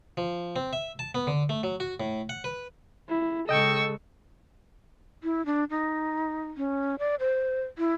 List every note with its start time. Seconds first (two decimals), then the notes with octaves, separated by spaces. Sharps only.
0.17 F3
0.56 C4
0.73 E5
0.99 A5
1.15 B3
1.27 D3
1.49 A3
1.63 F#3
1.80 F#4
2.00 A2
2.29 F#5
2.44 B4
3.09 E4
3.49 C#3 G#3 A4 D#5 G5 C#6 E6
5.23 E4
5.46 D4
5.70 D#4
6.57 C#4
6.99 D5
7.20 C5
7.78 E4